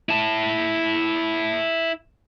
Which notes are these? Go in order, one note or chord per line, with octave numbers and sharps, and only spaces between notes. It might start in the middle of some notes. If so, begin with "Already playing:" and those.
E4 A5